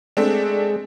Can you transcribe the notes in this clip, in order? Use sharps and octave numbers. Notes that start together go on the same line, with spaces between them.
G#3 A3 C4 D4